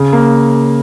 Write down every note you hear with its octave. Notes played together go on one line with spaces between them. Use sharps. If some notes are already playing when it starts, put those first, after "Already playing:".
Already playing: C#3
A#3